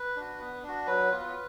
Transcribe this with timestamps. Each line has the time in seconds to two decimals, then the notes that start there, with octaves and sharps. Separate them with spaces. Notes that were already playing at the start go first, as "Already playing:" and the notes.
Already playing: B4
0.16 D4 F#4
0.40 B3
0.63 D4 F#4
0.87 F#3 B4
1.11 B3 F4